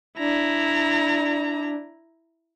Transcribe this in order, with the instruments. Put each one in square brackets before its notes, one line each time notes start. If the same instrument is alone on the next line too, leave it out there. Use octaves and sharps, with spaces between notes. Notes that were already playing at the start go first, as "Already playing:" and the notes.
[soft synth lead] D4 [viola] E4 A#5